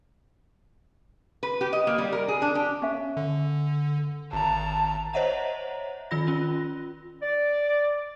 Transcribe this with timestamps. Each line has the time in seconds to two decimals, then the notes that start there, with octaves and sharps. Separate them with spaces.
1.43 B4
1.61 G4
1.73 D#5
1.87 A#3
1.98 G3
2.12 A#4
2.28 G#4
2.42 D4
2.55 G4
2.82 C#4 E5
3.17 D3
4.33 G#1 A5 A#5
5.13 C5 C#5 D#5 E5 F#5 A#5
6.11 D#3 F4 B5 A#6
6.27 C#4 F4
7.22 D5